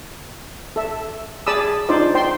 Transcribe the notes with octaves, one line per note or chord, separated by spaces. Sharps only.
A4 E5
G#4 D5 A5 B5 D#6 E6
D4 D#4 F4 C5 D5
C5 G5 C6